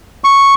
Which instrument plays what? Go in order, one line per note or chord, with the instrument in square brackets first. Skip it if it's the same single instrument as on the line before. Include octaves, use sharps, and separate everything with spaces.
[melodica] C#6